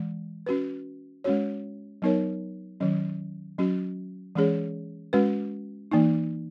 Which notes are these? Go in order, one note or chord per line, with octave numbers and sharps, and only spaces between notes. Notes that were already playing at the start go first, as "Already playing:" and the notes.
Already playing: E3 G#3
C#4 F#4 B4
G#3 C#4 F#4 C#5
F#3 B3 D#4 A#4 C#5
D#3 F#3 C#4
F#3 C#4 F#4
E3 G#3 C#4 G#4 C#5
G#3 C#4 F#4 B4
E3 A#3 D#4